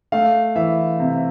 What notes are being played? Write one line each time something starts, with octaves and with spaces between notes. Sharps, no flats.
A3 F5
E3 E5
C3